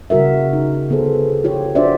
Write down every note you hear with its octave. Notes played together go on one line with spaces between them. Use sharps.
C#3 G3 F#4 A#4 E5
D#4
D3 B3 G#4 A4 C5
F4 G4 C#5
D4 F4 F#4 C5 D5 E5